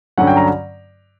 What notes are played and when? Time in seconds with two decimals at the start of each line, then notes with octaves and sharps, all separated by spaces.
0.18 G2 D3 F#3 C#4 F#5
0.27 G5
0.37 A#5